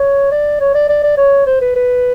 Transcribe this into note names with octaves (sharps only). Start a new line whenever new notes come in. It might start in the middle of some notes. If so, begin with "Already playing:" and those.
Already playing: C#5
D5
C#5
D5
D5
D5
C#5
C5
B4
B4